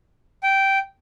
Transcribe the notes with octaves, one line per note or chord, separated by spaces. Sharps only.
G5